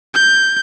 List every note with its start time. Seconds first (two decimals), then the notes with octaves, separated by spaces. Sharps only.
0.14 G6